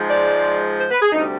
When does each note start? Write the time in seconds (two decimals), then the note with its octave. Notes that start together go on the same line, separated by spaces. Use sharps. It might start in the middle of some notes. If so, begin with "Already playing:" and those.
Already playing: G#2 F3 G#3
0.10 D5
0.79 C5
0.91 B4
1.02 G#4
1.12 D2 C3 G3 D#4